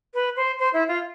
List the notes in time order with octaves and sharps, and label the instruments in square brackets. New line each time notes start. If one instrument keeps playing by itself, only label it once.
[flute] B4
C5
C5
E4
F4